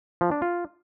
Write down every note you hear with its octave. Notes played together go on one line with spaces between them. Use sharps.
F3
D4
F4